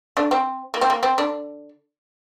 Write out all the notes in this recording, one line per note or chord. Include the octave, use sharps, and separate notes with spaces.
D3 D4
C4
A#3
C4
A#3
C4
D3 D4